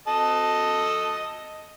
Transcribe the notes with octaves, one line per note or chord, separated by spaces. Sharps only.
A4 D#5 A5